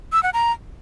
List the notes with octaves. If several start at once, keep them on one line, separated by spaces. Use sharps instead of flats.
E6
F#5
A#5